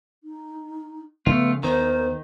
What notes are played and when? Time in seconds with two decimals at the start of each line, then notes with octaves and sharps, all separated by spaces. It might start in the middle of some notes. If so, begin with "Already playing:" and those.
0.24 D#4
1.26 C#3 F3 A3 B3 F4
1.63 D#2 D#3 B3 A#4 C5